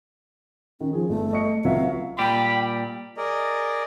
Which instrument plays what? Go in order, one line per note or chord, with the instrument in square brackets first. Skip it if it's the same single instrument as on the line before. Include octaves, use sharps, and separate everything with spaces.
[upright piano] D#3 [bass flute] C#4
[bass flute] F3 [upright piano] G#4
[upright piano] G1 [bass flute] A3
[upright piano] D#5 C#6 C#7
[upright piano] C#2 F#3 E5 [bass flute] F5
[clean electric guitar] A#2 G3 G4 [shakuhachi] G5 [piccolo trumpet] B5
[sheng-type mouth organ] G#4 A#4 D5 D#5